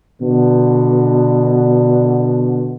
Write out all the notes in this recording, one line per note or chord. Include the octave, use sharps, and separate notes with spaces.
B2 D3